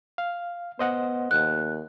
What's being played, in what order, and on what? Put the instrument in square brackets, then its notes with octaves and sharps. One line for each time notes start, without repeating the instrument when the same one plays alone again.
[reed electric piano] F5
[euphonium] B3 [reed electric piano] C5 D#5 F#5
[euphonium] D#2 [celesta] F#6